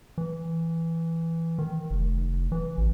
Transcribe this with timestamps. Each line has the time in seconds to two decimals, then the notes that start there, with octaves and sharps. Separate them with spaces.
0.18 E3
1.58 D#3
1.90 F1
2.52 E3
2.78 A1